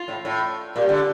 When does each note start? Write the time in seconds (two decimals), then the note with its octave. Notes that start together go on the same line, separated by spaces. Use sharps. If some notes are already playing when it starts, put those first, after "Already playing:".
Already playing: F4
0.08 A2
0.25 A2
0.76 A#2 G4
0.89 D3